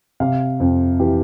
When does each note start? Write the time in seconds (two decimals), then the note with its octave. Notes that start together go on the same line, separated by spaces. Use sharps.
0.20 C3 F5
0.60 F2
0.99 E3 G4